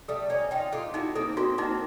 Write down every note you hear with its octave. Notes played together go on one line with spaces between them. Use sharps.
G3 A3 A4
C#4 D#4 D5
D#4 F4 G5
F4 G4 A4
D#4 E4 F#4
A#3 C4 A4
A#3 C4 F#4
A#3 C4 D#4